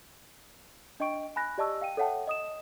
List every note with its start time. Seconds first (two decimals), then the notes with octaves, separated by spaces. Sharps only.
1.00 D4 D#5 G5 C#6 D7
1.36 G#5 B5 F#6 A#6
1.58 G4 D5 D#5 A5 C#6 E6
1.81 F5 G5 D#7
1.97 A4 C#5 E5 F#5 G5 A5
2.27 D#5 D#6 E7